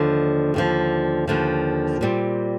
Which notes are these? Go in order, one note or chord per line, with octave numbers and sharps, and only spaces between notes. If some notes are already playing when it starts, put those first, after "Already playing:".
Already playing: D#2 D3 F3
D#2 D3 F3
D#2 D3 F3
A#2 G3 C4